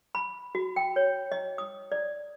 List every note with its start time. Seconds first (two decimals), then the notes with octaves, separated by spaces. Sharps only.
0.15 B5
0.55 F#4
0.76 G5
0.96 C#5
1.32 D#5
1.58 D#6
1.92 D5